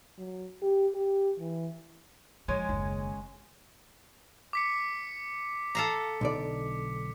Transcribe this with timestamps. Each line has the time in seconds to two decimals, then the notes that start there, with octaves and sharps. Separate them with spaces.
0.18 F#3
0.62 G4
0.95 G4
1.39 E3
2.48 F3 G#3 C#4 G#5
2.69 F#1 D#2
4.53 D6 B6 C#7
5.75 A4 F5 A#5
6.21 B1 D3 D5